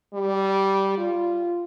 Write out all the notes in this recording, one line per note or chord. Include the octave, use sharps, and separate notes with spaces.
G3
F4